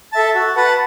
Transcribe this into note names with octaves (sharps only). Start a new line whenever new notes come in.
A4 E5 A5
F#4
B4 F#5 A5